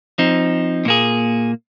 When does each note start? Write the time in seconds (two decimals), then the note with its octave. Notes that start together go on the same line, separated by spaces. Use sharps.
0.18 F3 C4 D#4
0.85 A#2 A#3 G#4